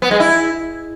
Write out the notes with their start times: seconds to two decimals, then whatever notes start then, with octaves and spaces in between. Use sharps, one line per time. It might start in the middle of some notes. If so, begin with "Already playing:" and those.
0.02 B3
0.11 G#3
0.20 E4